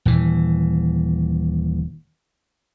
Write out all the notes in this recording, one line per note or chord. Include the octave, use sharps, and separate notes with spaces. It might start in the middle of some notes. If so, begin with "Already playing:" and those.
D#1 E3